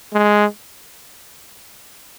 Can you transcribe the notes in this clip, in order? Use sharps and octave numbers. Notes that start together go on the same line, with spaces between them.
G#3